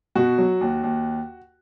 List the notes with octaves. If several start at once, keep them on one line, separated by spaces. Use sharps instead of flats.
B2 F#4
F#3
D#2
D#2